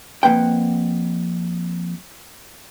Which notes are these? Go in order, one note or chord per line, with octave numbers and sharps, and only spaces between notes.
F2 G3 A#3 B4 F#5 G5